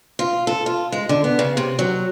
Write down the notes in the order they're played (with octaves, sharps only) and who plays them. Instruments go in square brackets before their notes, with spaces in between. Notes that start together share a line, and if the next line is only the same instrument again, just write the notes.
[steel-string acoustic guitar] F4
A4
F4
G#3
D3
B3
C#3
C3
F#3